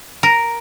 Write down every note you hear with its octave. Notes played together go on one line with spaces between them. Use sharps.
A#4